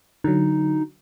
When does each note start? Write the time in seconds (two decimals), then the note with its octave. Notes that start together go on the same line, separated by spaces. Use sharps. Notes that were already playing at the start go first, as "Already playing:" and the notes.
0.24 D3 F#3 D#4